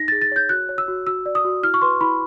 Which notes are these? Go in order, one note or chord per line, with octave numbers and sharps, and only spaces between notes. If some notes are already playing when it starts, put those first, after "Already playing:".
Already playing: D#4 A#6
G#4 A6
A6
C#5 G6
F#4 F#6
C#5
E6
F#4
F#4 E6
D5
D#6
F#4
E4 F6
C#6
B4 C6
E4 B5